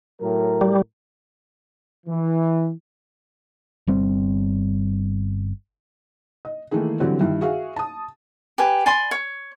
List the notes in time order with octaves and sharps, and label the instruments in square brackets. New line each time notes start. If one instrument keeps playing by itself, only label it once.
[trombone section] A2 F#3 A#4
[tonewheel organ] G3
[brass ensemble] E3
[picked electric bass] G1 G3 C4
[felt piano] D#5
D#3 E3 A3 A#3 D#4 G#4
D3 E3 F#3 G3 C4
G2 D#3 E4
F#4 G#4 E5 F5
A5 D#6
[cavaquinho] G4 B4 G#5
D5 G#5 B5 C6
C#5